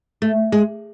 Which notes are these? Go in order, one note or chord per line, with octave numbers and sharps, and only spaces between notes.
A3
G#3